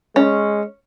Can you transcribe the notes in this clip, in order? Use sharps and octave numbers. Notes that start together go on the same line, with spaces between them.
G#3 C#4